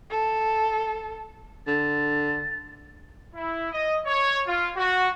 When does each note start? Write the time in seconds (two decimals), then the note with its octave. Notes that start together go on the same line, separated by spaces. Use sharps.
0.10 A4
1.67 D3 A6
3.35 E4
3.72 D#5
4.06 C#5
4.47 F4
4.76 F#4